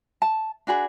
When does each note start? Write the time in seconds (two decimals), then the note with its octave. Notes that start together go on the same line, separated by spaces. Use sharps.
0.22 A5
0.67 D4 F#4 G#4 B5